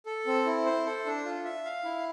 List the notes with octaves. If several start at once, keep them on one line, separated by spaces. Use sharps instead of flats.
A4
C4
E4
C5
A4
D4
F4
E5
F5
E4